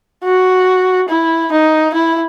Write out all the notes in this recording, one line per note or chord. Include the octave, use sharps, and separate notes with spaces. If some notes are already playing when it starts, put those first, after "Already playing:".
F#4
E4
D#4
E4